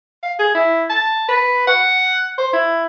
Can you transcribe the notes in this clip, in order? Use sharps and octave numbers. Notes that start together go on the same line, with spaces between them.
F5
G#4
E4
A5
B4
F#5
C5
E4